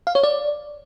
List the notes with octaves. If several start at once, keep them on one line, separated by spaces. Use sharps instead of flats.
F5
C#5
D5